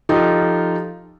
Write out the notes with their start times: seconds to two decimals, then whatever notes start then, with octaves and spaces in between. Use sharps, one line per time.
0.09 F3 D#4 F4 G4 A4